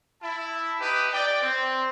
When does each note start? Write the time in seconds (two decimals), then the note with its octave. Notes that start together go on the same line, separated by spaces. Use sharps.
0.21 E4 A5
0.81 D#4 G4 B4 D#6
1.12 D5 G5
1.42 C4